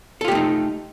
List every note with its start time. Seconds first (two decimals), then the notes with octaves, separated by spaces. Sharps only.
0.21 A4
0.24 F4
0.28 G4
0.32 A3
0.35 D#4